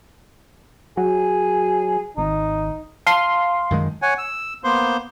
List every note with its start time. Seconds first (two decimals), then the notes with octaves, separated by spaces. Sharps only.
0.97 F#3 G#4
2.17 G#1 D#4
3.07 F5 A5 C6
3.70 F#2 D#3 G#3
4.02 C#5 F#5 G#5
4.18 E6
4.64 A#3 B3 C5 C6